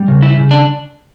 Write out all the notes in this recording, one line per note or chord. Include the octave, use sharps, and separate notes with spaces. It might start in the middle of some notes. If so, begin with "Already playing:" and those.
Already playing: G3
C#3
E4
C#3
D4